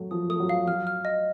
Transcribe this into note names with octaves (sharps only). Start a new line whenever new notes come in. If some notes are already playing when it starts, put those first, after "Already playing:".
Already playing: F#3 A3
F3 D#6
A3 D#6
F#3
F5
F#3 F6
F6
D#5